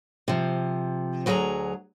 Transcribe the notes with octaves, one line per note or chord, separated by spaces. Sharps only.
C3 F3
D2 F#3 G#4 E5 A#5